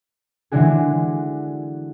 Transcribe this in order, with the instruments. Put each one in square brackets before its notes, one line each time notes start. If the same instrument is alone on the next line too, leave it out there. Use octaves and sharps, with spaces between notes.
[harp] D3 E3 G#3 D4 F#4 G#4